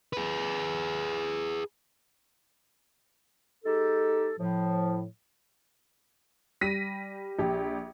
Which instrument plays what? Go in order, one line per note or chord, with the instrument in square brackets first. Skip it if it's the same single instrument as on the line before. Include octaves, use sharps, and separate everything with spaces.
[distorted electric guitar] G#4 B4
[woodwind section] G#3 D#4 G4 A4
A2 F3
[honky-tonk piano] G3 A#6 B6 D#7
A#1 G4